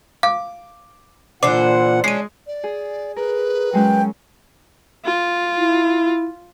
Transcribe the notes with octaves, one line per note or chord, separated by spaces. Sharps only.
F5 D6
A#2 D3 E3 D4 C5 F#5 D6
G#3 C#4 D4 C7 D#7
D5
G#4
G#4 A#4 B4
F#3 G#3 C#4 G5
F4
E4